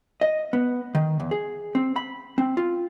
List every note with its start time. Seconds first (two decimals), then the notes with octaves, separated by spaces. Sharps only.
0.21 D#5
0.53 B3
0.95 D#3
1.20 E2
1.31 G#4
1.75 C4
1.96 B5
2.38 C4
2.57 F4